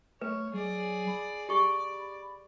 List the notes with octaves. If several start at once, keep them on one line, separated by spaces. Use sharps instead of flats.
A3 B4 C#5
F#3 G#4 D5
B5
G4 D5 C#6